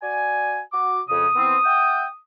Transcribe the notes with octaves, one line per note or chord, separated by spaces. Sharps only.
F#4 D5 G#5
F#4 D6
F2 C#3 D#6
E3 B3 C4
E5 F#5 G5